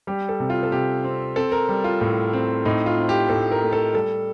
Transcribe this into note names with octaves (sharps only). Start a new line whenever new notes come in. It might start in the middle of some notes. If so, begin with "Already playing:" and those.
G3 G4
A4
C3
F4
A4
C3 G4
C4
C4 A4
A#4
G3
F4
A2
C4
A2 D#4
F4
C4
G4
A2 A4
A#4
A3
A4
G3 A4